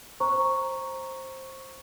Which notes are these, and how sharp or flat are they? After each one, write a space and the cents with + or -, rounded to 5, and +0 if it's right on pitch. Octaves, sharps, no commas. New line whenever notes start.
C5 +15 A#5 +0 C#6 +0